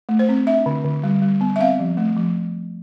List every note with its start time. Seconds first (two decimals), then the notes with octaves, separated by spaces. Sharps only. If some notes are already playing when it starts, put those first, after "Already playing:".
0.09 A3
0.19 C5
0.29 C4
0.46 D4 E5
0.66 D3
0.84 D3
1.04 G3
1.22 G3
1.41 B3
1.56 E5
1.59 C4 F5
1.79 F3
1.97 A3
2.17 F3